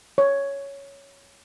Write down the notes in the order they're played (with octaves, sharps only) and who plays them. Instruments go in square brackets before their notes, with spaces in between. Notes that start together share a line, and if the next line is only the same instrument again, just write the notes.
[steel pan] C#5